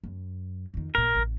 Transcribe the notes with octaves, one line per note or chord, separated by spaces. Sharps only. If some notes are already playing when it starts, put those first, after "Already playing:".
F#2
F2 D#3
A#1 A#2 A#4
A1 C#3